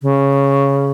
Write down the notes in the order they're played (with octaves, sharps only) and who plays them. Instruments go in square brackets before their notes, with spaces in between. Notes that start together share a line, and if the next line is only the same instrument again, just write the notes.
[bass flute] C#3